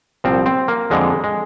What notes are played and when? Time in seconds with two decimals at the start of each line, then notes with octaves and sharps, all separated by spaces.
0.24 C2 A#2 F3 C4
0.46 C4
0.68 A#3
0.90 F2 D3 F3 G#3
1.24 G#3